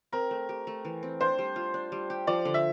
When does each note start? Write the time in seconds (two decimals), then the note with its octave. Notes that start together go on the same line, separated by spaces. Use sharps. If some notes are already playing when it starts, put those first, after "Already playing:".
0.12 C4 A#4
0.31 A3
0.49 G4
0.67 A3
0.85 E3
1.03 C4
1.20 D4 C5
1.39 G3
1.56 F4
1.74 D4
1.92 G3
2.10 G4
2.27 F3 D5
2.45 D3
2.54 E5